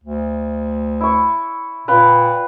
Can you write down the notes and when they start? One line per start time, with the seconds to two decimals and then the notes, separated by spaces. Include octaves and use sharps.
0.04 D2
1.01 E4 C#6
1.88 A#2 B4 F5 G5